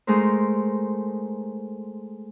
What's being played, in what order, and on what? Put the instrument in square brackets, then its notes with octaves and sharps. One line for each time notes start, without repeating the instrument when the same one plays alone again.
[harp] G#3 A3 D#4 A#4 C5